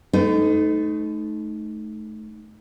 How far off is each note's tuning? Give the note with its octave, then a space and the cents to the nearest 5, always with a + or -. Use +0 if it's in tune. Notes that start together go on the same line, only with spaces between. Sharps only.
A3 -20 D#4 +0 B4 +40